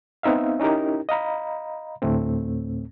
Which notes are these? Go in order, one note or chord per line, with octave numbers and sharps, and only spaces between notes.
B3 C4 D#4 E5 F5
C#4 D#4 E4 G4 A#4
D#5 F5 A#5 B5
D2 A2 A3 C4